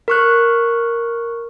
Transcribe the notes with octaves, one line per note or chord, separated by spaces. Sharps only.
A#4 C#6 F#6